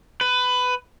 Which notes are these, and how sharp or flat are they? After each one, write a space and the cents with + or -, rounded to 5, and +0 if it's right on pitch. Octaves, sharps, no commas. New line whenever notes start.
B4 +15